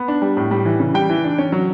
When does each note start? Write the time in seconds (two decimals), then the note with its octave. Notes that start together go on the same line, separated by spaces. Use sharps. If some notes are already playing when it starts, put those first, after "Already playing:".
Already playing: B3
0.08 D4
0.22 G3
0.37 A2
0.51 G3
0.65 E3
0.80 C#3
0.94 G3 G5
1.10 E3
1.24 D4
1.38 C#4
1.52 F#3